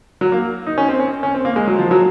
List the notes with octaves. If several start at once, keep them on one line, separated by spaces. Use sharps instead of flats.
F#3
A#3
D#4
C#4
C4
C#4
C#4
C4
A#3
G#3
F#3
F3
F#3